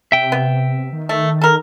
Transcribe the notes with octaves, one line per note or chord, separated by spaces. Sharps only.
C3 E5 G5
B3
D#3
A3
A4 A#4